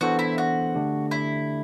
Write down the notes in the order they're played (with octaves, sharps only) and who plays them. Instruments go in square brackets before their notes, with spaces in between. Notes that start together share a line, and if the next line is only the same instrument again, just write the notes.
[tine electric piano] E3 B3 D4 A4 C5 [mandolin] F#4
[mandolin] E4
F#4
[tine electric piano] D3 A3 D4 G4
[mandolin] E4